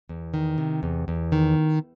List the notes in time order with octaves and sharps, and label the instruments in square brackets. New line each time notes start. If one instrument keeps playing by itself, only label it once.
[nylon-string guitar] E2
D#3
C3
E2
E2
D#3